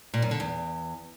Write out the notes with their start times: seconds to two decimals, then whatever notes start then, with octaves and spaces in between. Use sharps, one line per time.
0.14 A#2
0.22 F#2
0.31 D3
0.40 E2